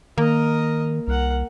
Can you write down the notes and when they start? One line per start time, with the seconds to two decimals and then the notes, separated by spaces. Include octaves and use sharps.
0.18 D#3 A#3 A#4 D#5
1.07 C2 A#4 F#5